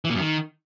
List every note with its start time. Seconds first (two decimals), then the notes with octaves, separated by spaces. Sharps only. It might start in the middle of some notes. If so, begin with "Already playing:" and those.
0.05 E3
0.10 A#2
0.15 F#2
0.20 D#3